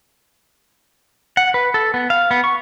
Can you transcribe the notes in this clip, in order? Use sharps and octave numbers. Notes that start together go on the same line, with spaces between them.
F#5
B4
A4
B3
F5
B3
C#6